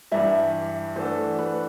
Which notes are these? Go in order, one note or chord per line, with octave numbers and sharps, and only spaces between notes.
G2 E3 G3 E5
E3 A3 D4 F#4 A4 C5
B4